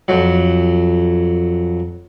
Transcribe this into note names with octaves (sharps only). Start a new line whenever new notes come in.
F2 F#3